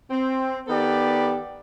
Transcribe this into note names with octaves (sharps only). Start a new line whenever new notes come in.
C4
D#3 B3 G4 A4 B4 D5